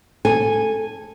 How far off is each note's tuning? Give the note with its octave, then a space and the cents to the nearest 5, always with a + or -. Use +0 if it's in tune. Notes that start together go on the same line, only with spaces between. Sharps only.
A4 +0 G#5 -10